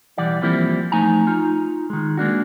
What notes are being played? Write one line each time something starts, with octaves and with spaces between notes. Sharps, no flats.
B1 E3 G3 D5 F#5
E3 F3 G3 A#3 C4 E4
F3 A3 D#4 G#5 A#5
D#4 F4
D#3 G#3
G#3 A#3 D4 F#4